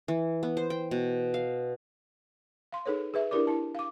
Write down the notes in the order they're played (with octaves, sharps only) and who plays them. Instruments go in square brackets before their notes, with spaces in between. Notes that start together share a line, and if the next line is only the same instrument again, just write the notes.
[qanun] E3
B3
C5
G5
B2
F5
[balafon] F5 C6
D#4 G#4 A4 B4 C#5
G#4 B4 E5
D4 E4 G4 A#4 D5 D6
E4 A5
F5 D6